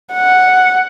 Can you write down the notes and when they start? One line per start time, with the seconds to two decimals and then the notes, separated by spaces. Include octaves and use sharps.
0.13 F#5